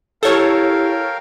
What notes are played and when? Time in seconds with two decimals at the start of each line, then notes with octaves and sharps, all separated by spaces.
0.23 E4 G4 A4 A#4 C#5 F5 G5